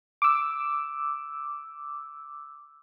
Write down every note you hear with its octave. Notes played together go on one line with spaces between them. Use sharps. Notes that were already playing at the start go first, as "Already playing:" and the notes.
D6 E6